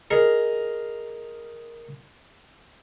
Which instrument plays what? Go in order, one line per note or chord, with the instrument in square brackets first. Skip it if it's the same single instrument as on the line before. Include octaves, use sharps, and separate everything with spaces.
[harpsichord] G#4 A#4 D#5